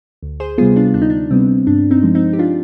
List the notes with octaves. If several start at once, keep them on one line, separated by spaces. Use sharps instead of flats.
D2
G#4 C5
C3 G3 B3 F4 G#4
D4 F4
D2 D4
D#4
D4
C3 G3 B3 C4
G2 D4
C4 D#4
F3 G#3
C4 D#4
G4
D4 F4